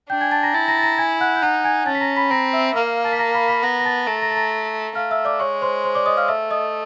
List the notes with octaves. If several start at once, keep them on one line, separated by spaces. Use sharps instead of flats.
D4 G5 G6
G#5 G#6
A5 A6
A#5 A#6
E4 A5 A6
A#5 A#6
A6
A#5 A#6
G#5 G#6
F#5 F#6
G6
D#4 F#5 F#6
G#5 G#6
C#4 A5 A6
B6
A#5 A#6
B5 B6
C4 A#5 A#6
E5 E6
A#3 F5 F6
A5 A6
B6
A#5 A#6
B5 B6
B5 B6
B3 A#5 A#6
A#6
A5 A6
A3 A#5 A#6
A#5 A#6
A6
A#5 A#6
A3 F5 F6
E5 E6
D5 D6
G#3 C#5 C#6
C5 C6
C5 C6
D5 D6
D#5 D#6
F5 F6
A3 E5 E6
D#5 D#6